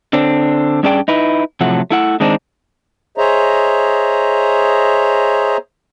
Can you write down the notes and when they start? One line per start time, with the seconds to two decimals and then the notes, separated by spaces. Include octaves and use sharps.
0.13 D3 C4 D4
0.83 G2 C#4 D4 G#4 D5 G5
1.08 D#4 E4 B4
1.61 A2 C3 F3 F#3 A3 F#5
1.91 A3 E4 F#5
2.20 D#3 G#3 C4 D4 D#4
3.18 G#4 C5 C#5 D#5 E5 A#5